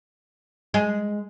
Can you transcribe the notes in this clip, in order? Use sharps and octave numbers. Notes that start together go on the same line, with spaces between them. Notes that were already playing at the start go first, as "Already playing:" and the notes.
G#3